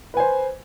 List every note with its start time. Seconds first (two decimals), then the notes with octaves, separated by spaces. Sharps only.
0.14 B4
0.17 G#5
0.20 C5